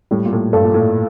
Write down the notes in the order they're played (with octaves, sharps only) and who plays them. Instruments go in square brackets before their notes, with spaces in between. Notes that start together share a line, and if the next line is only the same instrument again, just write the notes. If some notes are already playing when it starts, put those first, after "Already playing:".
[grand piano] A2 [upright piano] G3
[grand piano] A#2
A2
[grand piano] G2 [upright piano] A4
[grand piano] A#2
A2